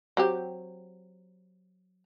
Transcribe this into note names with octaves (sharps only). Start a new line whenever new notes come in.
F#3 C4 G4